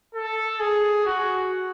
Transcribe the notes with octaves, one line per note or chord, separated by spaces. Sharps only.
A4
G#4
F#4